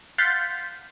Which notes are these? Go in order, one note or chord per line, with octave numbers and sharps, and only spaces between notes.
F5 F#5 C6 G6 A6 B6